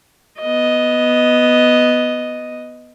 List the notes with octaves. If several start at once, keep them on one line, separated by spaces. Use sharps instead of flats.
B3 D#5